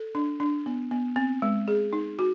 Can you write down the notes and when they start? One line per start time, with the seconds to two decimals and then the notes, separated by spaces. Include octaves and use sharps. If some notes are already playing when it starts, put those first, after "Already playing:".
Already playing: A4
0.15 D4
0.40 D4
0.66 B3
0.91 B3
1.16 C4
1.42 G#3
1.68 G#4
1.93 D#4
2.19 F#4